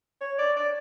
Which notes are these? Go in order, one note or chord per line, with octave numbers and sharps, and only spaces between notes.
C#5
D5
D5